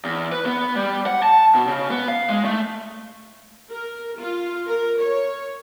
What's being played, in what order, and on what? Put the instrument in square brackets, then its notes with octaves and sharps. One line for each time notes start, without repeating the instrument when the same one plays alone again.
[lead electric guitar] E2
B4
B3
G3
F#5
A5
B2
C#3
B3
F5
G#3
A3
[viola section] A#4
F4
A#4
C#5